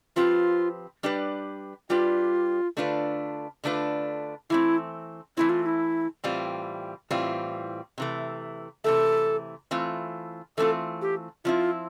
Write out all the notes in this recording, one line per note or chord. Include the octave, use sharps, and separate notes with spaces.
F3 C4 F4 G4 B4
G3 D4 G4 B4
G3 D4 F4 G4 B4
D3 A3 D4 F4 B4
D3 A3 D4 F4 B4
E3 A3 C4 E4
E3 A3 C4 E4
F4
F4
E4
A2 E3 G3 C4 F4
A2 E3 G3 C4 F4
C3 E3 A3
C3 E3 A3 A4
E3 A3 C4 F4
E3 A3 C4 F4 A4
G4
F3 C4 E4 F4